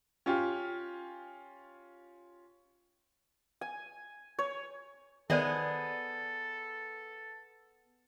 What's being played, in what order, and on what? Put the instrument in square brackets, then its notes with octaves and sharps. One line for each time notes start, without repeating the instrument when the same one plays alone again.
[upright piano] C#4 F4 G4
[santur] G#5
C#5
[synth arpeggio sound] D#3 [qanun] B3 G#4 [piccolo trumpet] A4 [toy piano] C5 D5 E5